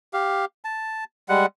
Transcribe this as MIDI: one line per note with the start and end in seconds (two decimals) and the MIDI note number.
0.13 0.45 67
0.13 0.45 77
0.64 1.04 81
1.29 1.46 55
1.29 1.46 56
1.29 1.46 78